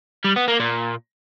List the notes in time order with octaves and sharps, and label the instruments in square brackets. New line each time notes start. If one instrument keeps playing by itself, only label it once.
[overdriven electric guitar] G3
B3
A#3
A#2